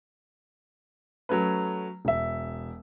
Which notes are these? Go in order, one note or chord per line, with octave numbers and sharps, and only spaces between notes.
F#3 A3 C#4 B4
E1 E5